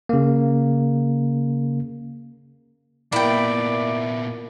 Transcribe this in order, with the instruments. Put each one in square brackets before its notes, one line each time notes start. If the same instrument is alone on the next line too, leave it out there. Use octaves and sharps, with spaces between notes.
[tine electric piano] C#3 A#3
[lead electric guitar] A#2 B3 [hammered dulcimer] A#3 [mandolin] E4 G5 [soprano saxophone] D5